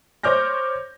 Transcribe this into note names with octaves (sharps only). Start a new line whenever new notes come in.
C5 C#5 D6 F6 G6 A#6